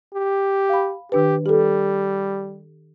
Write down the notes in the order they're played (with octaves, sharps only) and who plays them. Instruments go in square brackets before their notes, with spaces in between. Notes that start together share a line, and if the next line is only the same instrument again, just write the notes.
[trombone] G4
[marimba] F5 B5
[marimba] D#3 D4 B4 [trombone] G4
[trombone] G3 [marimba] G4 A4